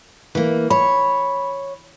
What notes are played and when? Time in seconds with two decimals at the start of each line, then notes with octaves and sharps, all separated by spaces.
0.35 E3 A#3
0.70 C#5 B5